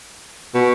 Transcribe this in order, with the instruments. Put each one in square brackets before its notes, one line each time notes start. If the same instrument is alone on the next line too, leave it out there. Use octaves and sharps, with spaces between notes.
[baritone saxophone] B2